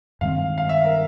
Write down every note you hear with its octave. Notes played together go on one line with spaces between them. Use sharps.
G2 D#3 G#3 C4 F5
F5
E5
A#4